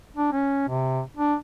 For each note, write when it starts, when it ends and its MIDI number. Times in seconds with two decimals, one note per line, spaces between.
0.17 0.32 62
0.33 0.66 61
0.69 1.01 48
1.17 1.35 62